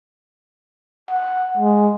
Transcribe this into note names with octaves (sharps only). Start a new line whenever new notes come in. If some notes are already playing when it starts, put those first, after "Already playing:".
F#5
G#3